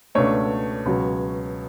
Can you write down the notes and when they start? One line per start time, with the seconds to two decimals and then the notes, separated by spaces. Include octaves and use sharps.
0.15 C#2 B2 A3 D4 C#5
0.86 C#2 B2 F#3